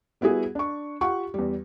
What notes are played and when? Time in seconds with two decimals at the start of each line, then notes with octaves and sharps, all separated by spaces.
0.21 G3 B3 E4 F#4 G#4
0.55 D4 C#6
1.01 F4 G4 F#5 C#6
1.34 E2 G3